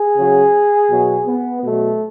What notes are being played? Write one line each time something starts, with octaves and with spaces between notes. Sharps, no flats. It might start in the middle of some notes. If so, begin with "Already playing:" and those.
Already playing: G#4
C#3 F#3
B2 F#3
B3
B2 F#3 A3